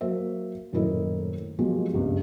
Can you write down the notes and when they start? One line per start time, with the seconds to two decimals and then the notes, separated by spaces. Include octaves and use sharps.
0.01 F#3 A#3 C5 E5
0.73 D#1 F#2 A2 E4 A#4 D#5
1.59 B2 F3 F#3 G#3 A#3 G4
1.92 F#1 C#2 G2